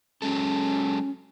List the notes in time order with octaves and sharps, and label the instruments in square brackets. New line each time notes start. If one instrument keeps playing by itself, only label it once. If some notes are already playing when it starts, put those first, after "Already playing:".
[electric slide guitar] F#3 G#3 A4 [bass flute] C#4